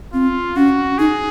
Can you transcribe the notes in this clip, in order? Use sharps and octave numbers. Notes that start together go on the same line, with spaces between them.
C4 F4
C#4 F#4
D#4 G#4